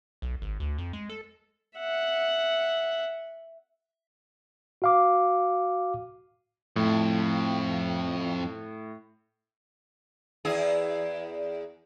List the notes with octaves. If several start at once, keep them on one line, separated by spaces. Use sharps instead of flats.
B1
G#1
D2
F2
G#3
A4
E5 F#5
F#4 F5 D6
F2 A2
E2 E4 G#4